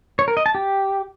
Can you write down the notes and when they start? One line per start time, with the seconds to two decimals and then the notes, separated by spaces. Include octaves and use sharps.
0.19 C#5
0.28 A#4
0.37 D#5
0.46 A5
0.55 G4